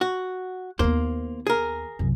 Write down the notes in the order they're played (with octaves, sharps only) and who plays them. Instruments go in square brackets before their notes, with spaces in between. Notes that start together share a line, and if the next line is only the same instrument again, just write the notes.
[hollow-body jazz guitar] F#4
[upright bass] D#2 B3 [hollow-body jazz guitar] A#3 C5
[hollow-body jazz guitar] G#4 A#4
[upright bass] C2 F#2